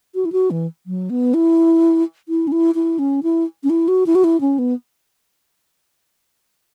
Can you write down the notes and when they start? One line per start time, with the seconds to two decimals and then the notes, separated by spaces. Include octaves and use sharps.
0.15 F#4
0.25 E4
0.32 F#4
0.51 E3
0.86 F#3
1.10 B3
1.34 E4
2.29 E4
2.47 C#4
2.52 E4
2.75 E4
2.99 C#4
3.23 E4
3.64 C#4
3.70 E4
3.88 F#4
4.06 E4
4.15 F#4
4.24 E4
4.41 C#4
4.59 B3